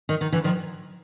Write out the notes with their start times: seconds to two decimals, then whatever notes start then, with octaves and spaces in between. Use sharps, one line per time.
0.09 D#3
0.21 D#3
0.32 D3 E3
0.44 D#3 F3